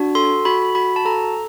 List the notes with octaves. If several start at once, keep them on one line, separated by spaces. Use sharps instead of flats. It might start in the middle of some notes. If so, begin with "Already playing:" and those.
Already playing: D4 F#4
A4 C6
F#4 B5
F#4 B5
A5
A4 A#5